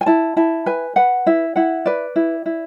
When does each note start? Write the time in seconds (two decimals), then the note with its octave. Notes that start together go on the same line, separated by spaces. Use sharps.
0.01 G#5
0.06 E4 A5
0.37 E4 A5
0.66 B4 G#5
0.96 B4 F#5
1.26 E4 E5
1.56 E4 F#5
1.86 B4 D5
2.16 E4
2.46 E4